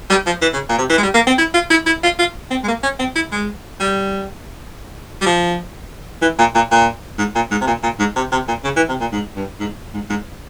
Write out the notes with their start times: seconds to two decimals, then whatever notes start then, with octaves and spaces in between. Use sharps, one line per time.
0.10 G3
0.26 F3
0.42 E3
0.53 C#3
0.69 A#2
0.78 C3
0.90 E3
0.98 G#3
1.03 G3
1.14 A#3
1.27 C4
1.38 E4
1.54 F4
1.70 E4
1.86 E4
2.03 F4
2.19 F4
2.51 C4
2.64 G#3
2.68 A#3
2.83 C#4
2.99 C4
3.15 E4
3.32 G#3
3.80 G3
5.21 G3
5.26 F3
6.22 E3
6.38 A#2
6.55 A#2
6.71 A#2
7.18 G#2
7.35 A#2
7.51 G#2
7.61 C3
7.67 A#2
7.83 A#2
7.99 G#2
8.16 C3
8.32 C3
8.48 A#2
8.64 C#3
8.76 E3
8.88 C3
9.00 A#2
9.12 G#2
9.36 G2
9.60 G#2
9.93 G#2
10.10 G#2